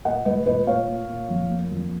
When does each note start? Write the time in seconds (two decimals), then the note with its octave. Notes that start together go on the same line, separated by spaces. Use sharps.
0.05 A#2 D#5 F#5
0.25 G#3 B4 D#5
0.46 A#2 B4 D#5
0.67 A#2 C#5 F5
0.88 A#3
1.09 A#2
1.29 F2
1.50 A#3
1.71 F2